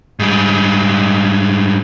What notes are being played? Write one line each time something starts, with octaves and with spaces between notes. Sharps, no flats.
G#2 G3